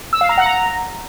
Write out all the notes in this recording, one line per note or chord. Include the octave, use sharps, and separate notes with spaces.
E6
F5
A#5
F#5
A#5